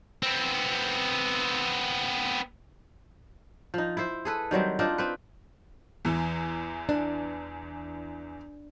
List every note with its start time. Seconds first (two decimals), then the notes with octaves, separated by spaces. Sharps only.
0.23 B3 C4
3.74 F3 D#4
3.97 E4 C5
4.25 G#4 A4 B4
4.51 D#3 F#3 G3 C4
4.79 C4 D4 D#4 F4
4.98 C4 B4
6.05 E2 E3
6.89 D4